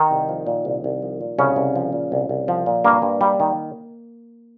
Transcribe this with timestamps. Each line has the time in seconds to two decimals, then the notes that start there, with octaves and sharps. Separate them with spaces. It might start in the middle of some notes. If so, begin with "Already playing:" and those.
Already playing: D#3 D#4
0.11 C2
0.29 F3
0.47 A#2
0.65 C2
0.84 C2
1.02 F3
1.21 A#2
1.38 C2 C#3 C#4
1.56 C2
1.76 F3
1.93 A#2
2.12 C2
2.29 C2
2.48 F3
2.66 A#2
2.85 G2 A#3
3.02 G2
3.21 G3
3.40 D#3